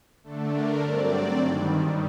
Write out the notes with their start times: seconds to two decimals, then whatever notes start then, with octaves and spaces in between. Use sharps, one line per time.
0.23 D3 A3 D4 A4
0.52 A#4
0.81 G2 F#3 C4 D5
1.39 G2 D#3 G3